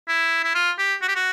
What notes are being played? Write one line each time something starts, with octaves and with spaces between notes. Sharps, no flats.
E4
E4
F4
G4
F#4
G4
F#4